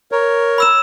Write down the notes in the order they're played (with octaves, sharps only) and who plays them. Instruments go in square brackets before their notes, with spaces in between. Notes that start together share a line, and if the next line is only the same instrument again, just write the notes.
[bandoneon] A#4 C#5
[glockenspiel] B5 E6 E7